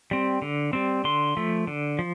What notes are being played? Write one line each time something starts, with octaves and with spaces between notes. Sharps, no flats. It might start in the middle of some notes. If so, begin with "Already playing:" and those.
G3 C4
D3
G3 C4
D3 C6
F3 A3
D3
F3